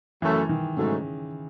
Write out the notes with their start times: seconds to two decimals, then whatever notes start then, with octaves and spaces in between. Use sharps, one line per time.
0.22 F#2 C#3 E3 F#3 A3
0.49 D#3
0.77 G#2 C#3 F#3 A3